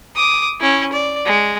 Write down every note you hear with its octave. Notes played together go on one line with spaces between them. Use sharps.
D6 D#6
C#4 E4
D5
G#3